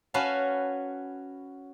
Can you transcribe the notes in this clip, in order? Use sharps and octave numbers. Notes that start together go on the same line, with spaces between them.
C#4 F#4 B4 F5 A5